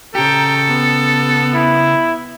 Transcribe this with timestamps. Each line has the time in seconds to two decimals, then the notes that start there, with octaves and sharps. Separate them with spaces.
0.15 C#3 G4 A4 G5 A#5
0.68 B3
1.54 E4